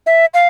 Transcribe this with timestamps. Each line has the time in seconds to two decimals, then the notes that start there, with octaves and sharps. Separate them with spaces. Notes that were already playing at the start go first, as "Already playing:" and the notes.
0.06 E5
0.34 F5